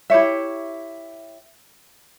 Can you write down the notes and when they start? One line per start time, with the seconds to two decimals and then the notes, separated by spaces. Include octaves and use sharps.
0.10 E4 G4 C#5 E5